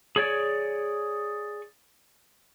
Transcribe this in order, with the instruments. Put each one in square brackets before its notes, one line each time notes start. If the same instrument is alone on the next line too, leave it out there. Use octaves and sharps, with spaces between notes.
[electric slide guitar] G#4 C#5 D5